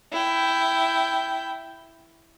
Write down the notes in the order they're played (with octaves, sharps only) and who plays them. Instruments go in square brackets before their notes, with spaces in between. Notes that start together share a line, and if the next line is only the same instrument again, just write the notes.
[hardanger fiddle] E4 G5